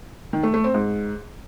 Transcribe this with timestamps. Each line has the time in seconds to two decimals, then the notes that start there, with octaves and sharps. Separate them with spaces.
0.33 D#3
0.43 A3
0.54 A3
0.64 C4
0.74 G#2